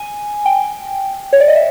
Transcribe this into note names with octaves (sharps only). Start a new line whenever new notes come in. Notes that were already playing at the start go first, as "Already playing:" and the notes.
Already playing: G#5
G5
C#5
D5
D#5
E5